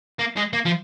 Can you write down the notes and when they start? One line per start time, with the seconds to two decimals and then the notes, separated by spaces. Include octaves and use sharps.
0.19 A#3
0.37 G#3
0.53 A#3
0.65 F3